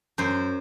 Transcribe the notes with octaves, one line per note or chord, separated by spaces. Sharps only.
F#2 C5